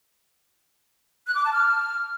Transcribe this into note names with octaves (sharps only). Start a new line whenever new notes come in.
F#6
D6
A5
F6